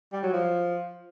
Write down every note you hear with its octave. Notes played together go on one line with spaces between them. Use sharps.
G3
F#3
F3